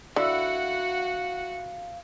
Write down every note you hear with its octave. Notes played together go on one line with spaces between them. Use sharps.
D3 E4 F#4 F5 F#5